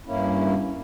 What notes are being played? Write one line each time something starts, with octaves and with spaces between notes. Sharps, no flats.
G2 A#3 C#4 E4